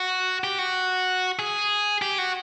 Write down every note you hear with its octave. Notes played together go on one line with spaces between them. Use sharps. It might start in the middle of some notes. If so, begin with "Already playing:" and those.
Already playing: F#4
G4
F#4
G#4
G4
F#4